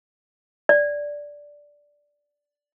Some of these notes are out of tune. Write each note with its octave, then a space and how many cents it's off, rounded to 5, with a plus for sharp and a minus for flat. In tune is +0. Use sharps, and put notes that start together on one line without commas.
D5 -5